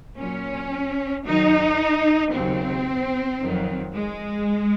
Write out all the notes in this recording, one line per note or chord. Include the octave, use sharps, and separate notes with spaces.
A#2 F#3 C#4
F#2 D#3 F#3 D#4
D#2 C#3 F#3 C4
F2 D#3 F#3
G#3